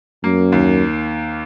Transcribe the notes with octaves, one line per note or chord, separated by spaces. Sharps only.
F#2 A#3
D#2